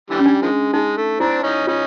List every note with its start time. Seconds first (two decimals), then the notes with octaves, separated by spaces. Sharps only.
0.10 D3 E3 G3
0.19 C#4
0.26 D4
0.42 D#3 F3 G#3
0.73 G#3 D#4
0.97 A3
1.20 C4 D4 E4
1.44 C#4 D#4
1.67 C#4 D#4 F4